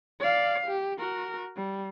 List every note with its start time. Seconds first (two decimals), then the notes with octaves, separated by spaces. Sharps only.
0.20 D5 F5
0.67 G4
0.99 F#4 A#4
1.56 G3